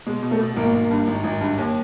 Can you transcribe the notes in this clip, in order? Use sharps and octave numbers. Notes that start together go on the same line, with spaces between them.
B2 G#3
B2
A3
B2
G#1 A#3
G#1
G2
G#1
G#1
G2
D#2